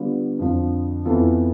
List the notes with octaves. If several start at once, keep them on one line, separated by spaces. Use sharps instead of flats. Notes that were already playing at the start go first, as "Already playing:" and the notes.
Already playing: D3 G3 B3 F4
F2 D3 F3
F2 E3 B3 F4 A4